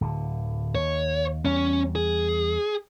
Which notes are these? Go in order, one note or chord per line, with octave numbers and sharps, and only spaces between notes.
D1 D3
D#2 C#5
E2 G3 C#4
G#4